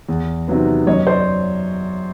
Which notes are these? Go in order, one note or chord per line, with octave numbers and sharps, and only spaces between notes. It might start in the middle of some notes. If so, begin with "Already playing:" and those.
E2
C3 D#3 F#3 B3
F#2 C#5 D#5
C5 D5